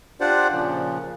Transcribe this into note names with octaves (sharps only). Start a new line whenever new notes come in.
D4 F4 G4 C5 D5 F#5
A#2 C#3 F3